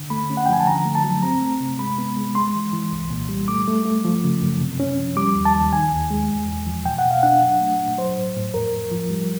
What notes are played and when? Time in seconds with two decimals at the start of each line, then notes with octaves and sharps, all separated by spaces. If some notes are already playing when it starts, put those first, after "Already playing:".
Already playing: D3
0.10 A3 B5
0.30 C#4
0.37 F#5
0.46 G5
0.49 F3 G#5
0.60 A5
0.66 D3 A#5
0.85 A3
0.95 A5
1.04 F#3
1.23 C4 A#5
1.42 A3
1.61 C3
1.79 G#3 B5
1.98 B3
2.17 G#3
2.35 G#3 C6
2.55 E3
2.73 E3
2.92 C2
3.11 A#2
3.29 G3
3.48 A3 D6
3.68 A3
3.85 A3
4.05 F3
4.24 C#3
4.42 F#2
4.61 C3
4.80 C#4
4.98 F3
5.17 G3 D6
5.36 D#2
5.45 A5
5.55 D#2
5.73 D#3 G#5
5.93 D#2
6.10 G#3
6.30 E2
6.48 E2
6.66 F3
6.85 B2 G5
6.98 F#5
7.05 B2
7.11 F5
7.23 D4 F#5
7.42 F#3
7.61 A3
7.79 A#2
7.98 F#3 C5
8.17 A2
8.36 A2
8.54 F2 A#4
8.73 F3
8.91 F3
9.10 G3